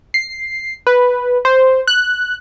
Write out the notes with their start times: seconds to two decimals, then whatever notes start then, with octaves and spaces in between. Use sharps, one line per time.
0.14 C7
0.87 B4
1.45 C5
1.87 F#6